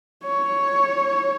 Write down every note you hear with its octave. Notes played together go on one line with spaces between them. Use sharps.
C#5